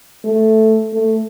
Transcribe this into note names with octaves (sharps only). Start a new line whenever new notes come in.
A3
A3